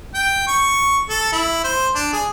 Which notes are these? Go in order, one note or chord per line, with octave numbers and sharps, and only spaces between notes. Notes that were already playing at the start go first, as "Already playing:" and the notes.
G5
C#6
A4
E4
C5
D4
G#4